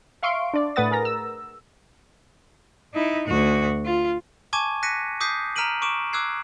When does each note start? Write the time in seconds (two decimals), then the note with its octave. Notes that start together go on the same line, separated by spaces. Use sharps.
0.23 E5 F5 C6 C#6 D7
0.54 D4 D5
0.76 A2 A3 B4 F#5 D#6 A6
0.91 G#4 A#4 A#5 A#6
1.05 E6
2.94 D#4 E4
3.28 D2 F#4
3.86 F4
4.53 G#5 A5 C#6 D6 G#6 D#7
4.83 F#6 A#6 B6 C#7 D#7
5.20 D6 D#6 G6 B6 C7
5.56 A#5 F6 B6 D7 D#7 F#7
5.82 C#6 D6 D7 E7
6.13 D6 E6 F#6 G#6 C7